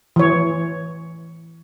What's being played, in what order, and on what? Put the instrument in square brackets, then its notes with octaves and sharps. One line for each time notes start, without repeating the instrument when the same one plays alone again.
[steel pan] E3 C#5